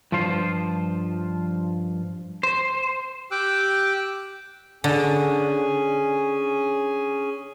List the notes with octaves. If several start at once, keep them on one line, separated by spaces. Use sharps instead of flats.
G2 F3 F4 C5
C5
G4 G5 D6 E6 F#6
D3 C#4 G#4 G#5